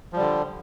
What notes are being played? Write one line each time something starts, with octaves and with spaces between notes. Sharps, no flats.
D3 F3 G3